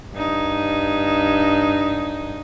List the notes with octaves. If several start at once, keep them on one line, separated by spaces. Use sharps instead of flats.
G2 D#4